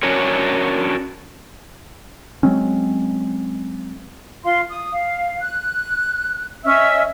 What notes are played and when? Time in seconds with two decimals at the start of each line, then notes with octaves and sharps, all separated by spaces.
0.03 C#4 D4 F#4 A#4 C#5
2.43 F#3 G#3 C4 C#4
4.44 F4 F5 C6
4.69 D#6
4.92 F5
5.41 F#6
6.64 C#4 D#5 E5 E6